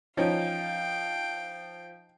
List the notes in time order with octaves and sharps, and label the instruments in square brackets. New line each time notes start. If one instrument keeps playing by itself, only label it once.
[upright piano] F3 [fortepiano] C#4 D#4 [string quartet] F5 G5